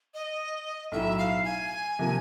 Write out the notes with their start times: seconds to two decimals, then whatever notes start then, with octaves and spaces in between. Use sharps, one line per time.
0.14 D#5
0.92 B1 A2 F#3 E5
1.18 F5
1.45 G#5
1.99 C3 F3 A#3